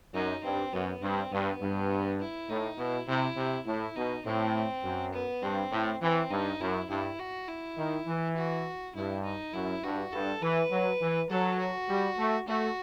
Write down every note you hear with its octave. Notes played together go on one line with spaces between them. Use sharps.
F#2 D#4
G2 C4
F#2 B3
G2 C4
G2 B3
G2
E4
A2 D#4
B2 E4
C3 E4
C3
A2 E4
B2 D#4
A2 C4
F#2
B3
G2 C4
A2
E3 C4
G2 D#4
F#2 E4
G2 E4
F#4
E4
D#3
E3
F#4
G2 E4
D#4
F#2 E4
G2 F#4
G2 A4
E3 B4
F#3
E3
F#3 A4
F#4
G3
A3
A3 F#4